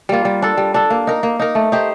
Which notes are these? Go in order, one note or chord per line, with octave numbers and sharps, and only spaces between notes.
G3 A#3 F4
G3
D4 A4
G3
D4 A4
A#3
D#4 A#4
A#3
D#4 A#4
A3
D#4 G4 C5